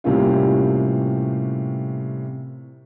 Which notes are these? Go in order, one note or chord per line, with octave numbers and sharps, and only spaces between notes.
A2 C3 G3 A#3 C#4 F4